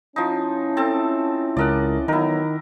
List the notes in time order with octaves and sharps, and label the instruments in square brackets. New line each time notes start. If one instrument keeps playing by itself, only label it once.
[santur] F3 D#4 [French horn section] C#4 E4
[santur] C4 A4 A5
[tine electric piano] C#2 A#4 [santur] D5 D#5 F#5
[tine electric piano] D#3 D#4 [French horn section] E3 F#3 B3 [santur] E4 A#4